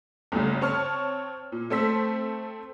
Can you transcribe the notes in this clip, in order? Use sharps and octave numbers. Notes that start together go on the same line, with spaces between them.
G1 D2 C#3 G3
C4 C#5 A5 C#6 F6
A#2
A3 C4 A4 C5 E6 B6